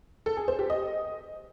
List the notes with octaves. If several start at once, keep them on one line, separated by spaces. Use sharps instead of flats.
A4
G#4
C5
G4
D#5